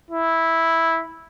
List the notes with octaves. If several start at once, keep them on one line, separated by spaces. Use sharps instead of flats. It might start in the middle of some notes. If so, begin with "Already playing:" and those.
E4